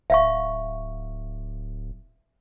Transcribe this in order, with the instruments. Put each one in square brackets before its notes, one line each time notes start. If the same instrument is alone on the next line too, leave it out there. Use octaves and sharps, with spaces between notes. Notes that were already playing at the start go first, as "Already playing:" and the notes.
[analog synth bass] D1 [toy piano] E5 F5 C#6